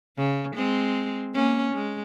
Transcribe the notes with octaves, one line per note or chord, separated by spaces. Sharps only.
C#3
G#3 C4
A#3 C#4
G#3